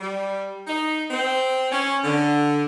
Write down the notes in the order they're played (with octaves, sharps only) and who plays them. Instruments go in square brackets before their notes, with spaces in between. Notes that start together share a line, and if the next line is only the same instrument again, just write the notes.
[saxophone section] G3
D#4
C4
C#4
D3